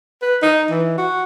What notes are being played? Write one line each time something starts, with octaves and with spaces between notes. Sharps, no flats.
B4
D#4
E3
F#4